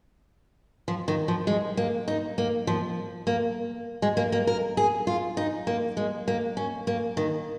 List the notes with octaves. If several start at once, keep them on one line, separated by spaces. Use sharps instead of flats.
F3
D#3
F3
G#3
A#3
D#4
A#3
F3
A#3
G#3
A#3
A#3
A#4
G#4
F4
D#4
A#3
G#3
A#3
C#4
A#3
D#3